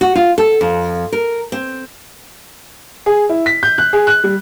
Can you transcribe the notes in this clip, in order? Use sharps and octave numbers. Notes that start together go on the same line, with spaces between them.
F#4
F4
A4
F2
A#4
C4
G#4
E4
B6
G6
F#6
G#4
F#6
G3